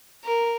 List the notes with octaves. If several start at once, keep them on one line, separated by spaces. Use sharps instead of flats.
A#4